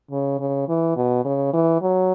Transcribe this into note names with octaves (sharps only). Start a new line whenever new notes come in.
C#3
C#3
E3
B2
C#3
E3
F#3